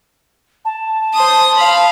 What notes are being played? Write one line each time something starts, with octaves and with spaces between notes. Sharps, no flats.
A5
C5 D#6
F5 B5